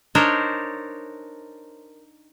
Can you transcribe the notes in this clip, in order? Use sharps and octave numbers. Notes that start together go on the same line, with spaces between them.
D4 D#4 A#4 C5 C#5